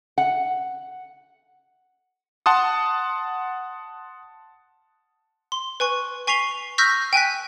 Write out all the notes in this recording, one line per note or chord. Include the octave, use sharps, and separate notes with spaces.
F#5
F#5 A5 C6 D#6
C6
B4 G#5 C#6
G#5 C#6 B6 C7 F7 G7
C#6 E6 F6 G6 A#6 B6
G5 G#5 F#6 B6